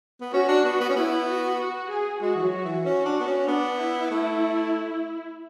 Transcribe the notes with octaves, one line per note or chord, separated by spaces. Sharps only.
B3
C#4 F#4
D4
B3
B3
C#4
B3 E4
F#4
F#4
G#4
G#3 F#4
E3
F#3
F#4
E3
C#4 F#4
D4
B3 F#4
C#4
B3 D4
E4
A3